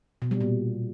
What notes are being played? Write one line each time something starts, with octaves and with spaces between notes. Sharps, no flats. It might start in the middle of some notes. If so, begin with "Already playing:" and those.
B2
G3
A#2